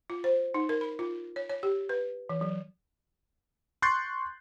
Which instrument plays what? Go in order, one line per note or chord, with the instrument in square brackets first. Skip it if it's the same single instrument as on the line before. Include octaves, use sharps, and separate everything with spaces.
[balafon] F4
C5
D#4
A#4
B5
F4
C#5
C#5
G4
B4
E3
F#3
[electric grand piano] C6 C#6 F#6 G6 A6 C7